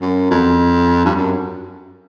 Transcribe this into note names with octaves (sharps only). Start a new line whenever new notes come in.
F#2
F2
G2
F#2